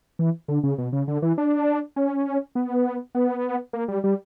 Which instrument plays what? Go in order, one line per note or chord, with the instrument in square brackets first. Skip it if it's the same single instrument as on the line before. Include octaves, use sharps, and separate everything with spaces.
[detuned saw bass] E3
D3
C#3
B2
C#3
D3
E3
D4
C#4
B3
B3
A#3
G3
G3